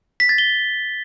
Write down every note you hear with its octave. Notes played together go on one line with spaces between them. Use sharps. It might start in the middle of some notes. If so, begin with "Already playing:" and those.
B6
A6
G7